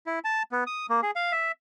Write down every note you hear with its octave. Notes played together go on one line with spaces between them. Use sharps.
E4
A5
B3
D#6
A#3
G#4
F5
E5